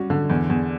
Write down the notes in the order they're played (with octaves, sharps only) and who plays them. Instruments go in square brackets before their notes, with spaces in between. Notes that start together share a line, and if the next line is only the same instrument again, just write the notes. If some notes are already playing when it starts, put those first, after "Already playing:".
Already playing: [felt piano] G3 C#4 F#4
D3
E2
E2